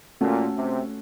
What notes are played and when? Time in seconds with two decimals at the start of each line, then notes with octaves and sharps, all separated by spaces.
0.21 A#2 A3 C#4 F#4 A4
0.55 C3